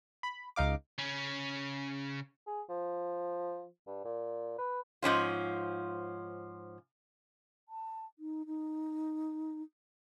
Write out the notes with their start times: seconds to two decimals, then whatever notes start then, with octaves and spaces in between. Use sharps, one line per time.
0.23 B5
0.56 C#2 D#4 F5 D6
0.98 C#3 C#4
2.47 G#4
2.69 F3
3.87 G2
4.05 A#2
4.58 B4
5.02 G#2 F3 C#4 F4
7.69 A5
8.19 D#4
8.46 D#4